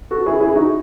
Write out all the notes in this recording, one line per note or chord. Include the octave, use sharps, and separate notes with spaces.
F#4 A4
E4 G#4
E4 G#4
D#4 F#4